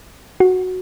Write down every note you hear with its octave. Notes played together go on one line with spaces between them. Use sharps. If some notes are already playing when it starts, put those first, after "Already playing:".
F#4